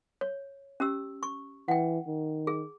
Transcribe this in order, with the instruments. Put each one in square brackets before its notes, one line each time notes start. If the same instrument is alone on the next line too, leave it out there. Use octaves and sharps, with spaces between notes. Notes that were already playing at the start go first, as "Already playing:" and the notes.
[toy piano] C#5
C#4 G4 E6
C#6
[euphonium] E3 [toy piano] F#5 G5
[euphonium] D#3
[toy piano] G#4